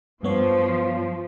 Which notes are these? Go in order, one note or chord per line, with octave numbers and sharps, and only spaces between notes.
G2 F3 B3 C#5